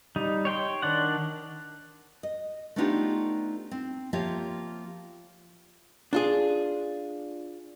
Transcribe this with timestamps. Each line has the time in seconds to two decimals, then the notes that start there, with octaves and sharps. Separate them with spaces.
0.16 G3 D#4
0.45 C#5 G5 C6
0.82 D#3 D4 D5 F#5
2.23 D#5
2.76 A3 B3 D4 D#4 F4 G4
3.71 C4
4.13 F3 A#3 F4 G4 C#5 E5
6.13 D4 F4 G#4